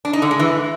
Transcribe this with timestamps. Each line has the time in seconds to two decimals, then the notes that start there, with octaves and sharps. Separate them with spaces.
0.05 D4
0.13 D#4
0.22 D3
0.31 G#3
0.39 E3